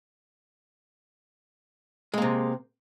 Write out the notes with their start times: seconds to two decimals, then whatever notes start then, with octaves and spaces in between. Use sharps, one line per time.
2.14 G#3
2.18 A#3
2.22 C3